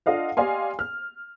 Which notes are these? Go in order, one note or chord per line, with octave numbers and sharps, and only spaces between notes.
D4 F4 A4 D#5 F5 F#5
G4 D5 D#5 F5 G#5 C6
F6